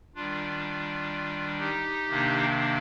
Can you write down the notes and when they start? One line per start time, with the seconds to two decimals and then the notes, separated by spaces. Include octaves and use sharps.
0.15 D#3 G3 D4 F4
1.59 D#4 G4
2.08 C3 D#3 A#3 D4